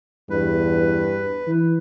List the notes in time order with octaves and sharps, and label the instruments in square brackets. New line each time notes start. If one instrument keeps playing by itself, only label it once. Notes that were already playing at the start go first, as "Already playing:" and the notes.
[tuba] E2 [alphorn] G2 [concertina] B4
[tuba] E3